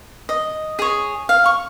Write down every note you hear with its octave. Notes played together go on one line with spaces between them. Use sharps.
D#5
G#4 C#5
F5
C#6